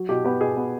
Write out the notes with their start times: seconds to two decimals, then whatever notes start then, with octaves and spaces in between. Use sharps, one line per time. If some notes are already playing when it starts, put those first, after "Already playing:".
Already playing: F#3
0.09 B2 G4
0.24 B3 G4
0.41 B2 G#4
0.57 B3